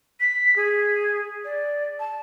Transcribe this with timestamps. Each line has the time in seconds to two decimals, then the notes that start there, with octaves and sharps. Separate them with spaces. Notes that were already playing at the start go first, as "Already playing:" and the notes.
0.20 B6
0.56 G#4
1.45 D5
1.99 A5